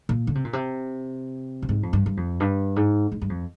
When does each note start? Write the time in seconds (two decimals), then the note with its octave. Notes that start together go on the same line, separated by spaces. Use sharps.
0.09 A#2
0.27 D3
0.35 C3
0.45 A#2
0.53 C3
1.62 A#2
1.69 G#2
1.83 F2
1.93 G2
2.06 G2
2.17 F2
2.40 G2
2.76 G#2
3.12 G#2
3.22 G2
3.30 F2